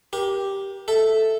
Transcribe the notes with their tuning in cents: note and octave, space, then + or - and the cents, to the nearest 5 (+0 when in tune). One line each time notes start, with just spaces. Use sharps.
G4 +0 A#4 +35
A4 +0 E5 +0